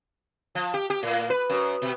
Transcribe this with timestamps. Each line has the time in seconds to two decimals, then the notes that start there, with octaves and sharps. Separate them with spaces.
0.55 F3
0.74 G4
0.90 G4
1.03 A2
1.30 B4
1.50 F#2
1.82 B2